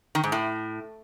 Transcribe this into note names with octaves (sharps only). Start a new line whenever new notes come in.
D#3
G#2
A2